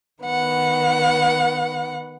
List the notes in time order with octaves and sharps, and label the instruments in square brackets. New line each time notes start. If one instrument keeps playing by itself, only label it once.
[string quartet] D#3 B3 F#5